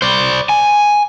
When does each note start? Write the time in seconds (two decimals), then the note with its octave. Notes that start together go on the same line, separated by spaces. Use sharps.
0.02 C5 D5
0.49 G#5